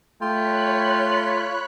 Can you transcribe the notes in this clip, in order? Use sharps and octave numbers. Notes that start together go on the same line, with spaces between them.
A3 F4 C#5 G5 B5 F#6